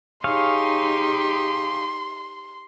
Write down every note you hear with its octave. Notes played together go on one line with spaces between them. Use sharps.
D#4 G4 G#4 C#5 F5 C6